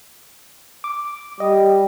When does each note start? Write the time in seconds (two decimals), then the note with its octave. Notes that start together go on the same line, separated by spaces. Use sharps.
0.84 D6
1.40 G3 D#5